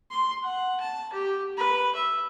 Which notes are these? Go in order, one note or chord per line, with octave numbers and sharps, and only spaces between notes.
C6
F#5
A5
G4
B4
E5